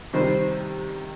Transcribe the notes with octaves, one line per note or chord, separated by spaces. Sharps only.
C3 D#3 G3 C5